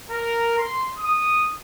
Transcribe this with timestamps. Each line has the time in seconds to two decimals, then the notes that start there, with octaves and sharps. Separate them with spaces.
0.11 A#4
0.57 C6
0.98 D#6